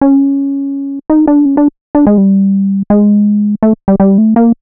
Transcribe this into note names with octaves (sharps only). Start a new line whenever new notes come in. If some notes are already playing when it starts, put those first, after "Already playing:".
C#4
D#4
D4
C#4
D4
D4
G#3
G3
G#3
A3
G3
G3
A3
A#3